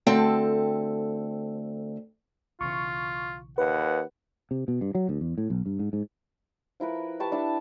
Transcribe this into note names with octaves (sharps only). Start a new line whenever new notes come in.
D2 C4 A4 G5 A5
B1 C#3 E3 F4 C#6
D#2 B4 F#5
C3
B2
G2
F#3
D2
E2
A2
B1
G2
G#2
G#2
F3 E4 A#4 B4
G4 B4 A5 C#6
D4 E4 A5